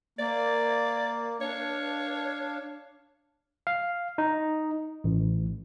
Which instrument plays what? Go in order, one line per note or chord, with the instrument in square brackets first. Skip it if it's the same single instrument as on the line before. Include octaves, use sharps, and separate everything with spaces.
[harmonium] A#3 [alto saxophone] D5
[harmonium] D4 F5 [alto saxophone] C#5
[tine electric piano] F5
D#4
A1